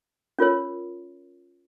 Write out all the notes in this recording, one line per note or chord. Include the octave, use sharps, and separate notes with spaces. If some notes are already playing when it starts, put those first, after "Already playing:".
C#4 F4 A#4 C#5